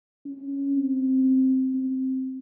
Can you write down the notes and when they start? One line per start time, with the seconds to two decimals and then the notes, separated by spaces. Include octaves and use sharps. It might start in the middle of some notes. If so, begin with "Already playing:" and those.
0.26 C#4
0.75 C4
1.74 C4